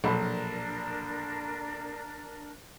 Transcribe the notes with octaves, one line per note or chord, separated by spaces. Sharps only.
A#1 B2 F#3 D4 A4 A#4 B5